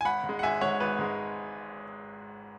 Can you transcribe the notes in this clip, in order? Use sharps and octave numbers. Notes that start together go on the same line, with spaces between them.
G#5
G#1 F#5 B5
G#2
G#3
F#5
G#1 E5 G#5
G#2 G#3 C#5 F#5
G#1 B4
G#2 G#3